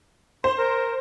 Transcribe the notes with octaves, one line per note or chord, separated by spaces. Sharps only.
C5 C6
A#4